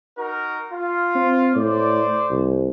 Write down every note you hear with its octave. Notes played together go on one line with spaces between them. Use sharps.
D#4 F#4 A#4
F4
C4
A2 C5 D5
C2